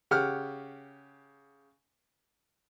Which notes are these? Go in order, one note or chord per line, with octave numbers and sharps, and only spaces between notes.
C#3 G4 F#5 F6